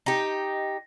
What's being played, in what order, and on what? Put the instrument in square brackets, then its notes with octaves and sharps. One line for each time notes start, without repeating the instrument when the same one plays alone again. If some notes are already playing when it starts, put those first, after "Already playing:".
[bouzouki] D#4 G4